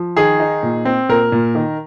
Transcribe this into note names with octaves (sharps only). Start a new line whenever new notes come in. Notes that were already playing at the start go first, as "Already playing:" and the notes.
Already playing: F3
D#3 G#4
D#4
A#2
C4
A#2 A#4
A#2
D#3